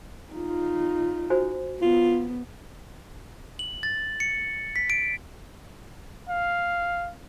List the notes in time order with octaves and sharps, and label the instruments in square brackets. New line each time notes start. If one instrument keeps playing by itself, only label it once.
[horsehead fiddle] D#4 F4
[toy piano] F#4 C5 G#5
[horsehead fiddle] B3 [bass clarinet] F4
[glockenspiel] F#7
A6
C#7
B6
D7
[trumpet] F5